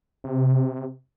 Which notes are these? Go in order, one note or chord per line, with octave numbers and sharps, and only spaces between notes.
C3